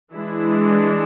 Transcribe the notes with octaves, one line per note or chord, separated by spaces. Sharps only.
E3 G#3 D4 E4